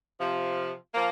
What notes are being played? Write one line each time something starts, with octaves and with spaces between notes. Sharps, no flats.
C3 F3
F3 A#3